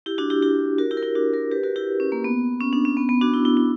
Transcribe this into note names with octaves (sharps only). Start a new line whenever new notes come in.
E4 G4
D4 F#4
E4 G4
E4 G4
F#4 A#4
E4 G4
A#4
E4 G4
D4 F#4
F#4 A#4
G4 B4
F#4 A#4
E4 G4
C#4
A#3
B3
C#4
D4
C#4
B3
B3
D4 F#4
E4
E4
E4